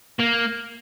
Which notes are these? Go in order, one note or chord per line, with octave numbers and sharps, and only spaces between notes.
A#3